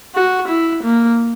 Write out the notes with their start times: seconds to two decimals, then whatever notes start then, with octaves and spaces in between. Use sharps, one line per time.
0.15 F#4
0.49 E4
0.84 A#3